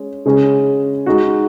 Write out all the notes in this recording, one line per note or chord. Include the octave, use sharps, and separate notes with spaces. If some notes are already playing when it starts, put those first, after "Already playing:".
Already playing: G#3 C#4
C#3 G#3 C#4 G#4
G#3 D#4 F#4